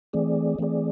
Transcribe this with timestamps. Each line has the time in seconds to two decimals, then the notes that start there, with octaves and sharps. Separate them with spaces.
0.13 E3 A3 C4 G#4 D5
0.59 E3 A3 C4 G#4 D5